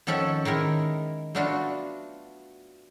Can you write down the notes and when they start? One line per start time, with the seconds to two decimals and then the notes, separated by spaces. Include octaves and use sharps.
0.07 F2 D#3 C#4 A4 E5 F#5
0.45 D#3 G#3 E4 A#4
1.35 A3 B3 D4 F4 F#4